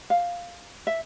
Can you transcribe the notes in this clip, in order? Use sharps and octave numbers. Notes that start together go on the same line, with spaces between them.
F5
E5